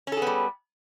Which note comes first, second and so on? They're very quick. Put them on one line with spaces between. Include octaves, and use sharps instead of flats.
C#4 A4 G#4 B3 G3